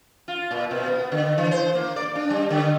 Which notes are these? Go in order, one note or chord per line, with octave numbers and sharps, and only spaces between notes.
F4
A#2
B2
B3
D3
E3
C5
A#3
D5
D4
G3
D3